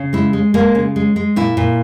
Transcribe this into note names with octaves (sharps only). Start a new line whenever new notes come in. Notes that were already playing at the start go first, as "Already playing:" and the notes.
Already playing: C#3
G#3 E4
G#3
G#3 A#3
C#3
G#3
G#3
A#2 E4
A#2